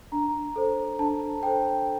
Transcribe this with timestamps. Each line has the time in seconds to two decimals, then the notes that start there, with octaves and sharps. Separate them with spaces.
0.12 D4 A#5
0.56 A4 C5
0.99 D4 A5
1.43 A4 C5 G5